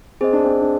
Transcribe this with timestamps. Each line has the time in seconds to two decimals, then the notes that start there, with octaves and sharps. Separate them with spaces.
0.21 C4 G#4 C5 D#5
0.33 D4
0.44 C4
0.61 D4